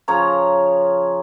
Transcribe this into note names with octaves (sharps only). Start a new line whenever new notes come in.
C#3 F3 C#5 A#5